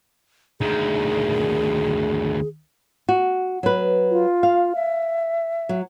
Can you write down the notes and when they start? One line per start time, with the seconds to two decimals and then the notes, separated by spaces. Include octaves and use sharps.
0.61 D2 D#3 G#4
3.09 F#4
3.63 F#3 B4
4.11 F4
4.43 F5
4.75 E5
5.69 F#3